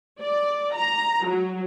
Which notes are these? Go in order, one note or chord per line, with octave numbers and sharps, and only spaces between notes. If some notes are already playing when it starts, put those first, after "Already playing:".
D5
A#5
F#3